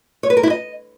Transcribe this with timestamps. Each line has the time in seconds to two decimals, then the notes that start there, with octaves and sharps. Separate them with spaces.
0.23 C#5
0.30 B4
0.37 A#4
0.43 E4
0.50 D#5